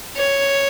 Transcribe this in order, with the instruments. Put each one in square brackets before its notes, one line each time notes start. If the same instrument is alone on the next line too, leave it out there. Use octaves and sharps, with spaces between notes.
[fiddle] C#5